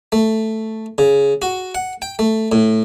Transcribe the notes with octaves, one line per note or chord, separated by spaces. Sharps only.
A3
C#3
F#4
F#5
G5
A3
A2